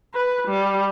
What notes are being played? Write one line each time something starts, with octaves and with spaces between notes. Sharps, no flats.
B4
G3